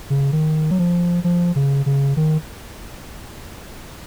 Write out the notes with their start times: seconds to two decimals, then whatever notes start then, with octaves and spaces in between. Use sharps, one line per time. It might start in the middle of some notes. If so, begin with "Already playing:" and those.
0.10 C#3
0.32 D#3
0.71 F#3
0.79 F3
1.24 F3
1.56 C#3
1.86 C#3
2.17 D#3